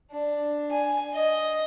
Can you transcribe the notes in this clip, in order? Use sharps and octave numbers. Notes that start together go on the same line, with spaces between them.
D4
G#5
D#5